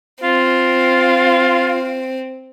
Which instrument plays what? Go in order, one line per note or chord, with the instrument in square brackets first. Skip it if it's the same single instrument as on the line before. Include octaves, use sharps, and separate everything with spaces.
[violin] C4 [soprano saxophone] F4